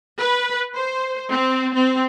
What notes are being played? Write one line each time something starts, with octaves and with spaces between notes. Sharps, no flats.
B4
C5
C4
C4